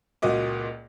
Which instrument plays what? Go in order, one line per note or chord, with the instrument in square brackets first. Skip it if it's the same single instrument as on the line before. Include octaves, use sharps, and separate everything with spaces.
[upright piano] C#2 A#2 A#3 F#4 D#5 D6